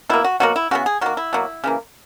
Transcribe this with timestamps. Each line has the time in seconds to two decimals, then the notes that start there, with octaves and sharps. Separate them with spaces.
0.09 B2 A#3 E4
0.24 F#4
0.40 B2 F#3 A#3 F#4
0.56 E4
0.71 C#3 E3 B3 F#4
0.86 G#4
1.01 D#3 A#3 F#4
1.17 E4
1.33 B2 F#3 A#3
1.64 C#3 E3 A#3